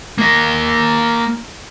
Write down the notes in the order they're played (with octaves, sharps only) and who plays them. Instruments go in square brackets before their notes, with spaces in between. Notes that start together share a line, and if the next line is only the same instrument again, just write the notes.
[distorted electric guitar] A#3 D#5